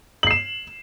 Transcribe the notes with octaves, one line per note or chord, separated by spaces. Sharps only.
C7 E7 F#7